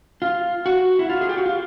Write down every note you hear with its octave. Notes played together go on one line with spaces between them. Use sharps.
F4
F#4
E4
F4
G#4
G4
F#4
F4